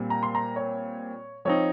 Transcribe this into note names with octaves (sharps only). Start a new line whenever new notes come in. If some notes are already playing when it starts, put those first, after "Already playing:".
Already playing: A#2 G3 C4
A#5
C6
A#5
C#5
F3 C4 D#4 C#5